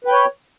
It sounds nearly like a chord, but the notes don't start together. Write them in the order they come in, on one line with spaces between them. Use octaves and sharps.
B4 G5 C#5